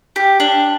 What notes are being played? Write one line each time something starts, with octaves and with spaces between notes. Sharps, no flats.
G4
D4